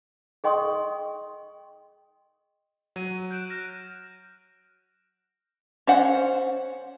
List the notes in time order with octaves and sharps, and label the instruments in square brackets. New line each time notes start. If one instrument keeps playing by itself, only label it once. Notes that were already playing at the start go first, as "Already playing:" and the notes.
[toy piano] G#4 D#5 G5 C6 C#6 D#6
[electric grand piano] F#3 [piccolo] D#7
[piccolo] F#6 [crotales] G6 D7 E7
[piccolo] F6 [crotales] F#6 A#6 E7
[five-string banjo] C#4 C5 F#5